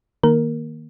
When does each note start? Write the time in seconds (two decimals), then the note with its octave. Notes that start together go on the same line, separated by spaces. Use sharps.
0.23 D#3 A#3 A#4